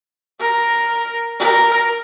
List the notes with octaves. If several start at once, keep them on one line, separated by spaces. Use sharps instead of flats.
A#4
A#4